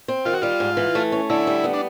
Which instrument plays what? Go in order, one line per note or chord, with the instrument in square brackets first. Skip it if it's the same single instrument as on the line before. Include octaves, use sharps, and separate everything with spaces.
[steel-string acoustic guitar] C4
[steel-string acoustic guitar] D#3 [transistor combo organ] F4
[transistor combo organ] F#4
[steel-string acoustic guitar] G3 [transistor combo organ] F4
[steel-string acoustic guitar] G#2
E3
A3
C#4
[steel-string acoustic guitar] D3 [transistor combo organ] E4
[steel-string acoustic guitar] G3
B3
[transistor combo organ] D4